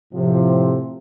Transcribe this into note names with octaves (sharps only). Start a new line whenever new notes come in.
A2 C3 F3